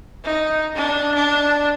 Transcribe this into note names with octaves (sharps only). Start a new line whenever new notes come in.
D#4
D4
D4